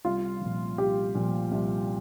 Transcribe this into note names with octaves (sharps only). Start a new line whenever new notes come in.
C2 F4
A#2 F3
C2 G4
A#2 F3
C2